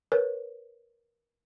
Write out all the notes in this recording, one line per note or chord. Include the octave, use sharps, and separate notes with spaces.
A#4 B4 C#5